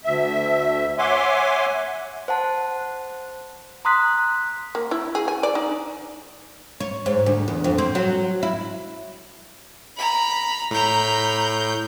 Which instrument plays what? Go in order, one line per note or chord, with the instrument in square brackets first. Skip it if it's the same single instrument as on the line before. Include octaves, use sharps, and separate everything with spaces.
[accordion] D2 E5
C#5 E5 F#5 G#5 C6 D6
[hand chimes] C5 F#5 A5
A#5 C6 D#6 F#6 B6
[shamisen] A#3
E4
G#4
G#5
D5
D#4
[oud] C#5
G#2
D2
E2
F2
C4
F#3
E4
[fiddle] A#5 B5
[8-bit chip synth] A2 G6 [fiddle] A#5 B5